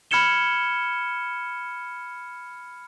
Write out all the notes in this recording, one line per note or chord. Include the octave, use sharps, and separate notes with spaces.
B5 F6 G#6 C#7 E7 G7